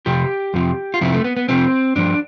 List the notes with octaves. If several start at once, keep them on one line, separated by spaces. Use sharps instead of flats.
F2 C3 F3 G4
F2 C3 F3
F4
F2 C3 F3 E4
A3
B3
B3
F2 C3 F3 C4
G2 F3 D4